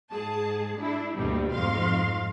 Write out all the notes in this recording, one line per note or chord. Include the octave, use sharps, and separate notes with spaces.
G#2 G#4 A5
D4 E4
D2 G2 B2 G3 A#3
F2 G#2 F5 C6